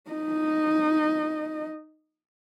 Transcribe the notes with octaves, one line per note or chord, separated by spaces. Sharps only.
D#4 D#5